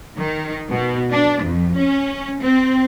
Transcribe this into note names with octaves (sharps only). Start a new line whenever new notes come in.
D#3
B2
D4
F2
C#4
C4